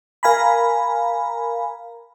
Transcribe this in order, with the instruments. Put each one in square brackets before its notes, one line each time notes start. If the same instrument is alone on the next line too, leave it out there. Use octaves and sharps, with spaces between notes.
[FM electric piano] A#4 F5 G#5 A#5 B5